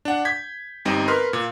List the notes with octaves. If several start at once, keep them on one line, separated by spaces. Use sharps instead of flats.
D4 F#5
G6 G#6 B6
G1 G3 C4 D#4 D#5
A#4 B4 B5 C6 F6
A#2